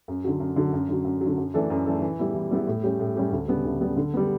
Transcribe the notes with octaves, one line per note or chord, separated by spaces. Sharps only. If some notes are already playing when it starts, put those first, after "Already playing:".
F#2
D3 F#3
F#2
D3 F#3
F#2
D3 F#3
F#2
F#3
D3
F#2
E3 A3 D4 A4
F#2
E3 A3 D4 A4
E3
G3 B3 E4
E3
G3 B3 E4
A2
G3 C#4 G4
A2
G3 C#4 G4
D2
C#3 G3 B3 D4
D2
C#3 G3 B3 D4
D3
G3 B3